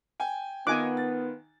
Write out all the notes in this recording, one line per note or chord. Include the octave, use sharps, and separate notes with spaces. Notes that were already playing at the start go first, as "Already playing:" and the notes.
G5 G#5
D#3 B3 D#4 F4 G#5 D6 F#6
A6